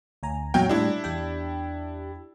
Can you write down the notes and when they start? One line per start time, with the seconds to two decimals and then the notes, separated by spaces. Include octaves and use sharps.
0.23 D2 G#5 A#5
0.54 E2 A#2 F#3 C#5 G5
0.69 A2 G3 D4 E4
1.04 E2 G4 G5